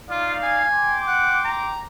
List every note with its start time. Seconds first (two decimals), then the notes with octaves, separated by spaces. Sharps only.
0.10 D#4 F4 D5 F5
0.43 G#5
0.74 G5 C6 D6
1.08 F#5
1.45 A#5